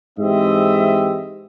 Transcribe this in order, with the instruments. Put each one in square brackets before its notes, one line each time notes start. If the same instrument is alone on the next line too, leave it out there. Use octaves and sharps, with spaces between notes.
[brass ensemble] G#2 E3 C4 G4 D#5 E5